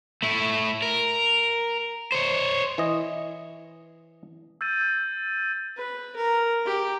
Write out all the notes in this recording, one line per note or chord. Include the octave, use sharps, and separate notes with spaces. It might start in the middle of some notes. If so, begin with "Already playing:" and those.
A3 E4
A#4
C5 C#5
E3 D#5
E6 G6 A6 D#7
B4
A#4
G4